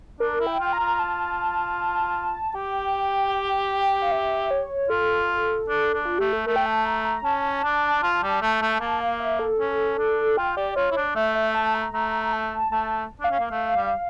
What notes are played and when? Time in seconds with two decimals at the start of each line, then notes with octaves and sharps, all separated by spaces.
0.20 D4 A#4
0.40 E4
0.47 G5
0.60 F4
0.73 A#5
0.80 F4
0.99 A5
2.55 G4 G5
4.02 F5
4.12 E5
4.51 C#5
4.89 F4 A4
5.69 D4
5.94 D4
6.05 F4
6.18 A3 G4
6.33 A4
6.46 A3 A#4
6.56 G5
6.66 A5
6.85 A#5
7.05 A#5
7.24 C#4 A5
7.64 D4
8.03 F4
8.23 G3
8.42 A3
8.62 A3
8.81 A#3 A5
9.00 F5
9.20 E5
9.39 A4
9.59 C#4
9.98 D4
10.37 F4 G5
10.57 G4 D5
10.76 F4 C#5
10.92 E4
10.97 D4
11.15 A3 E5
11.35 E5
11.55 A5
11.74 A#5
11.93 A3 A#5
12.33 A5
12.72 A3 A5
13.21 D4 F5
13.31 C#4
13.40 A#3
13.50 A3
13.76 G3